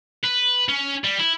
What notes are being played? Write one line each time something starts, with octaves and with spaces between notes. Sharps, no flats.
B4
C#4
G3
E4